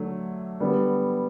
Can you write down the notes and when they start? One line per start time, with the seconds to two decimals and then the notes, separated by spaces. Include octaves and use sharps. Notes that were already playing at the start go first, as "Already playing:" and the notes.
Already playing: D3 F#3 A3
0.60 D3 G3 B3